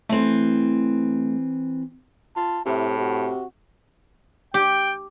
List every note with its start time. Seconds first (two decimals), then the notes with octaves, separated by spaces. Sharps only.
0.09 E3 A3 C4
2.36 F4 A5
2.66 A2 C3 E4
2.98 C3 F#4
4.54 G4 G5